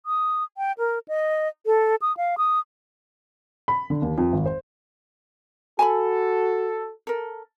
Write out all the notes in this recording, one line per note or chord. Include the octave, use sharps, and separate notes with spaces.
D#6
G5
A#4
D#5
A4
D#6
F5
D#6
B5
D3
D#2
F2
G#1
C5
F#4 A4 G#5 A5 B5
A4 A#4